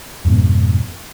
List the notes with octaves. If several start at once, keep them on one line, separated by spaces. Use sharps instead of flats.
F2 G#2 B2